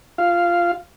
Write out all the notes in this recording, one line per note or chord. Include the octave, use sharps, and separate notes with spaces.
F4 F5